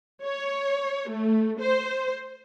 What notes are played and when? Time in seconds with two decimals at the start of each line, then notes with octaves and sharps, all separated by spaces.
0.23 C#5
1.11 A3
1.60 C5